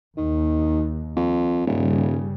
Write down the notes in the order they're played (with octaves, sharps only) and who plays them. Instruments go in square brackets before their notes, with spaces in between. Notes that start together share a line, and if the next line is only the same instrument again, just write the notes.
[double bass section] D#2 [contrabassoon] D#3
[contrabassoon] F2
[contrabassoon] D#1 [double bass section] G2 C#3 G3